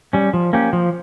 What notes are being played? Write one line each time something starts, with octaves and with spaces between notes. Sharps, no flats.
G3 C#4
F3
A#3 C#4 G4
F3